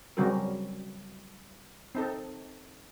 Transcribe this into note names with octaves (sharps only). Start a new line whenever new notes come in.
C#3 F#3 G3 C4 F#4 A#4
C4 D#4 A4